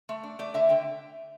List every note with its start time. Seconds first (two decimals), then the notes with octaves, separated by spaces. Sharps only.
0.09 A3
0.23 D4
0.39 A3 D5
0.54 D3 E5
0.69 D3 G5